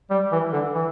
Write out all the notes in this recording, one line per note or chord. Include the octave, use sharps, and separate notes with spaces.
G3
E3
D3
E3